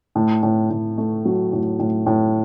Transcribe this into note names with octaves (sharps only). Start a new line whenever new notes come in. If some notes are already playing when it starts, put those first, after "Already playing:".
A2
A2
A2
A3
F#3
A2
A2
A2